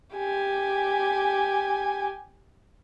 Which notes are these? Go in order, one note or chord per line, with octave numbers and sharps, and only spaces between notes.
G4 G#5